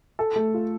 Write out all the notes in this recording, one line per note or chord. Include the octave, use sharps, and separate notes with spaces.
A4
A3
F4